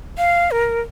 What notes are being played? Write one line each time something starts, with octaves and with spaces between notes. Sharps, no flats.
F5
A#4